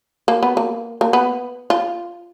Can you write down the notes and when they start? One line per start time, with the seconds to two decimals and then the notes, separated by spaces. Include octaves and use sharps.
0.28 A#3
0.43 B3
0.57 A#3
1.01 A#3
1.13 B3
1.70 F4